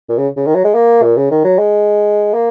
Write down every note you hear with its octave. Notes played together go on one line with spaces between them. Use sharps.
A#2
C#3
C#3
D#3
F#3
G#3
A#3
A#2
C#3
D#3
F#3
G#3
A#3